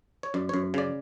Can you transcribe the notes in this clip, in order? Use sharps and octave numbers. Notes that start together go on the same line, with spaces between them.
C#5
F#2 D5
F#2 C#5
C#3 D5